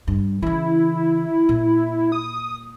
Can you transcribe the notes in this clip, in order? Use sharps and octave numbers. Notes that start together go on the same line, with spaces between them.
G2
C#3 E3 E4
A#2
D#6